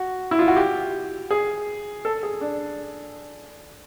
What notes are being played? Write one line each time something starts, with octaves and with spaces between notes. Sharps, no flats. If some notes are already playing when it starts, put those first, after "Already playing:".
Already playing: F#4
E4
F4
F#4
G4
G#4
A4
G#4
D4